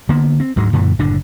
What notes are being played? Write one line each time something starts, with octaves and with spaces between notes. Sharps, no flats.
D3 A#3 B3
C4
D2 G#2 F#3 G#3
F#2 A#2 D3 E3
F#1 A2 D3 D4